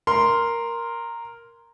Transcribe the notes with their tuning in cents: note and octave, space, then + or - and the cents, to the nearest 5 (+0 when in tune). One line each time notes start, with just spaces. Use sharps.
A#4 +0 C6 +0